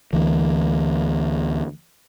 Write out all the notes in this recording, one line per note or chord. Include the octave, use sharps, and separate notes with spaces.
D2 E3